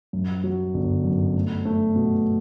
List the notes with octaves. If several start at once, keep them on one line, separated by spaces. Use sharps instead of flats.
F#2
F#3
G1
F#2
A3
A3
B2